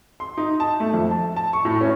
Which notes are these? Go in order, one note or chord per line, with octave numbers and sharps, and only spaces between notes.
C6
D#4
A5
A3
F2
A5
A5
C#6
A2
C#4